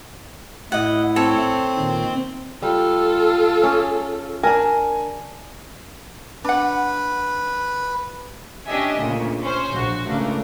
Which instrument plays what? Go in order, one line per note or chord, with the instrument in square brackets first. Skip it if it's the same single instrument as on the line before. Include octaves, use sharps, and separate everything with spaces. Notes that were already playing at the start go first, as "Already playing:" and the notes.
[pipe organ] A2 E4 [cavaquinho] D#5 F#5
[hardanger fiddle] C4 [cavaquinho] A4 C#5
[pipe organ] A#2 D#3
[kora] G3 [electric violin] F4 A4
[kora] C#4 G#4
[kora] D4 A#4 [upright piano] G#5
[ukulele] D4 F#5 [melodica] B4
[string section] C#4 D4 G4 D#5 E5 G#5
D2 A#2 C#3
C#4 C5
A#1 F#4
C#2 G#2 C#3 A3 A#3 D4